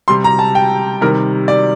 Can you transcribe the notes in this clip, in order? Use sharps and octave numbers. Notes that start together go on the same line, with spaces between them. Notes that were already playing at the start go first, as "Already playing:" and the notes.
C3 G3 C6
A#5
A5
G5
C3 D#3 G3 A#4
D5